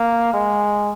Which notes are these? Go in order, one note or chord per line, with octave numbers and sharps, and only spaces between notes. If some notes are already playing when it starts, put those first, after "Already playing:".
Already playing: A#3
G#3